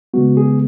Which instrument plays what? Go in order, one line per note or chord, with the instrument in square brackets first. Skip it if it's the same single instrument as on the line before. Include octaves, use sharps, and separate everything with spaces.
[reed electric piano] C#3 G#3 B3 F#4
G#4